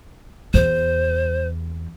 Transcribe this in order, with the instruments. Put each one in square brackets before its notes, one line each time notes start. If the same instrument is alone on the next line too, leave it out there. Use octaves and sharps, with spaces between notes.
[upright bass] E2 [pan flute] C5